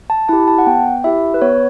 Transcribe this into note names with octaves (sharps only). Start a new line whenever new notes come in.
A5
E4 G4 A5
A5
F#5
B3 G5
E4 G4 E5
B4
B3 C#5